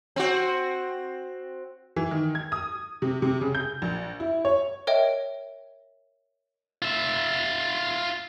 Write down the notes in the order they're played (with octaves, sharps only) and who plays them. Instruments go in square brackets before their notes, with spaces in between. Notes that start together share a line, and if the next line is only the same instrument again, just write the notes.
[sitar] C4 F#4
[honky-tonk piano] E3
D#3
G#6
D#6
C3
C3
C#3
G6
A#1
E4
C#5
[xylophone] A#4 C#5 D#5 E5 G5
[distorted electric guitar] F4 E5